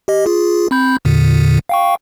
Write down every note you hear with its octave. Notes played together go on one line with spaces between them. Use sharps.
G4 D#5
F4 G#4
C4 B5 G6
E2 A#2 D3
F5 G5 C#6